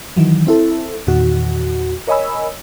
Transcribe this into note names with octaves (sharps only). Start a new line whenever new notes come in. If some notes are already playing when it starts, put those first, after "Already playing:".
D#3 E3 F#3
C4 E4 A4
E2 A#2 D#3 F#4
A#4 C#5 D#5 G#5 B5 E6